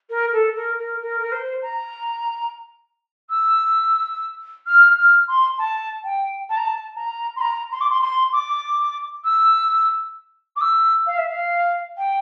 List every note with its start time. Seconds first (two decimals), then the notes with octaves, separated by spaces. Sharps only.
0.09 A#4
0.32 A4
0.55 A#4
0.78 A#4
1.01 A#4
1.20 A#4
1.31 C5
1.62 A#5
3.29 E6
4.66 F6
4.97 F6
5.27 C6
5.58 A5
6.04 G5
6.49 A5
6.57 A#5
6.64 A5
6.95 A#5
7.36 C6
7.40 A#5
7.71 C6
7.80 D6
7.90 C6
8.01 C6
8.32 D6
9.24 E6
10.56 D6
10.60 E6
11.06 F5
11.17 E5
11.29 F5
11.97 G5